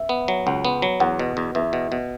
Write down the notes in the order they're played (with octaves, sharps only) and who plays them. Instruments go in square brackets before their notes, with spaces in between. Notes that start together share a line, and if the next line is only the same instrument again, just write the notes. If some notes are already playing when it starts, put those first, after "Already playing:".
Already playing: [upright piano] E5
[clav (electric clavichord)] B3
F#3
[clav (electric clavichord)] C#2 [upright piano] F#5
[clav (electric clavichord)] B3
F#3
[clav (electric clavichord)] E2 [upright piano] F#5
[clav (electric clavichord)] B2
E2
[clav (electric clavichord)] E2 [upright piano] E5
[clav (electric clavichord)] B2
B2